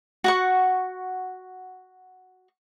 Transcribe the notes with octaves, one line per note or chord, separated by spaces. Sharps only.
F#4 F#5 C#6